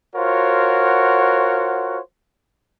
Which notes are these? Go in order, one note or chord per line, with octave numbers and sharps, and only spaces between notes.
F4 F#4 A#4 C5 C#5 F#5